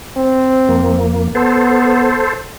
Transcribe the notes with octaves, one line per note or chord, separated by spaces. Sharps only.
C4
F2 A#3
B3 A4 C5